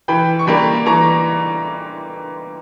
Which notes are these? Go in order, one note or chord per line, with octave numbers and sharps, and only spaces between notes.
E3 G5 B5
C#6
G3 A#3 G5 B5
E3 A#5 C#6